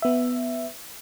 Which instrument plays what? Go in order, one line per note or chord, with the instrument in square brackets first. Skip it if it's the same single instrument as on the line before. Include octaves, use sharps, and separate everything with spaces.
[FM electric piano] B3 E5